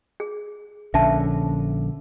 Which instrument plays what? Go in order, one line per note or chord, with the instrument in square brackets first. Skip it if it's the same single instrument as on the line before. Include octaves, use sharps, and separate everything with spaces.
[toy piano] G#4
[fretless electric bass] A#1 D3 C#4 [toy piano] E5 A5